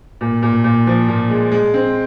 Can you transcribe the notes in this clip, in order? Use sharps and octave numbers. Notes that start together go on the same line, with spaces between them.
A#2
A#2
A#2
F3
A#2
G#3
G#3
C4